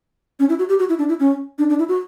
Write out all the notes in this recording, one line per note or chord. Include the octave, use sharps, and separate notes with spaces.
C#4
E4
F#4
G4
F#4
E4
D4
E4
C#4
D4
D4
E4
F#4